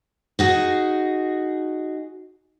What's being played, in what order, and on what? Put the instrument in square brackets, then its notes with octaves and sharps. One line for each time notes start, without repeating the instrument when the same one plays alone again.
[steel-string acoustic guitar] D#4 F#4 G#4